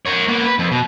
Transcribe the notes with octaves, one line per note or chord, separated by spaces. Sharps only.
A#4 C#5
A#3 B3
B4
F2
B2